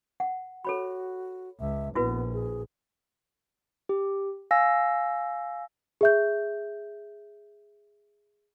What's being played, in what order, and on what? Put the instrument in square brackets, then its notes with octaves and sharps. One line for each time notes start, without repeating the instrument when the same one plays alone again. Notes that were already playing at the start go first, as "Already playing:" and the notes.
[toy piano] F#5
[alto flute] F#4 [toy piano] A4 C#5 B5
[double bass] C#2 [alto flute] E5
[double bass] A#1 [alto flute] B3 [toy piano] E4 F#4 B4
[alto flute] G#4
[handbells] G4
F5 G#5 E6 A#6
[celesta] G#4 E5 G6